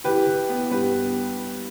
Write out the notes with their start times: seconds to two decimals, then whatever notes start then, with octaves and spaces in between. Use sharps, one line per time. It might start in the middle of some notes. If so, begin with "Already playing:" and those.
0.04 E3 G4 B4
0.27 E3
0.49 B3
0.71 G2 G4 B4